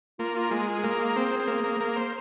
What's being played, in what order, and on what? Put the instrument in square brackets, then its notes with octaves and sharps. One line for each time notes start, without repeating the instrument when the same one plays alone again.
[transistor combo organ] A#3 [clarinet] F4
[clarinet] F4
[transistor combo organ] G#3 [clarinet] F4
[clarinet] F4
[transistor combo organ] A#3 [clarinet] G#4
[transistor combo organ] C4
C4
A#3
A#3
A#3
C5